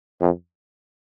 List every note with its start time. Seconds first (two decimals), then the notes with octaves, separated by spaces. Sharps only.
0.21 F2